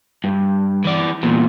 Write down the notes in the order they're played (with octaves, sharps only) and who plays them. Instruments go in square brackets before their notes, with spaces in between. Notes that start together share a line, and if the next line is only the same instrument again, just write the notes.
[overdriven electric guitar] G2
E3 D5
E2 A#2